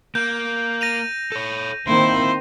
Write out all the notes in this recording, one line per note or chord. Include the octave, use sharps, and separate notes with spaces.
A#3 G6
A#6 D#7 F7
A4 C#5
D#3 A#3 C4 E4 C5